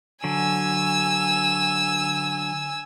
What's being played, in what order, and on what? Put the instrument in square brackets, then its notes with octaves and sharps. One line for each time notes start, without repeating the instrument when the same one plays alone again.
[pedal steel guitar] D3 F#3 [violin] G#5 E6